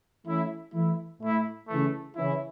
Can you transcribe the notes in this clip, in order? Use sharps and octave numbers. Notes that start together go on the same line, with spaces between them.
E3 A3 C#4 E4
E3 A3 E4
A2 A3 E4
C#3 E3 A3
C#3 E3 C#4 E4